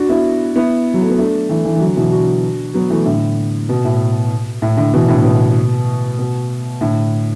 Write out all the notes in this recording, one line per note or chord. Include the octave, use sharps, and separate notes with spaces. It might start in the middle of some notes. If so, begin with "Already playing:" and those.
Already playing: D4 F#4
B3 E4
B3 E4
F#3
A3
B3
A3 D4
E3 A3
E3 A3
E3
D3 F#3
B2 E3
D4 F#4
F#3 B3
E3 A3
A2 D3
B2
A2
A2
A2 D3
B2 E3
A2 D3
B2
B2
A2 D3